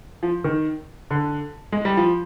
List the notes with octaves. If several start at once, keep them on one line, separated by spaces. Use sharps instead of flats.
F3
D#3
D3
G#3
G3
F3